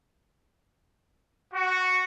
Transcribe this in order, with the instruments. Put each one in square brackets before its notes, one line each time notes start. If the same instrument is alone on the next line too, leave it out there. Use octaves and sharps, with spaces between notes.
[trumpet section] F#4